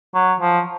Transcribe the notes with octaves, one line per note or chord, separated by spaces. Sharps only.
F#3
F3